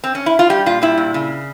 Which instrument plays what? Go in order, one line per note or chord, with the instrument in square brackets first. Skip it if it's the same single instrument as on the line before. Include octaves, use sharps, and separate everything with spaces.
[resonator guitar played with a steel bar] C4
C#4
E4
F4
G3 G4
A#2 F4
G3 E4
A#2
C#3